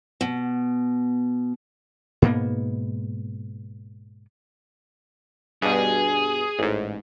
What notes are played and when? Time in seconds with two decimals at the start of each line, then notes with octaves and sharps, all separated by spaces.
0.21 B2
2.22 G#2 B2 A#3 B3
5.62 G2 B2 G#4
6.59 A1 G#2